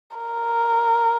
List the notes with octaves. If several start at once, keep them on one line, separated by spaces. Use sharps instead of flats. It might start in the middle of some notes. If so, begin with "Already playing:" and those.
A#4